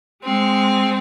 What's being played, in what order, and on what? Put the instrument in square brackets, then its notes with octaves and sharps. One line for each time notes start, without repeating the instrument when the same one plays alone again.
[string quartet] G#3 C4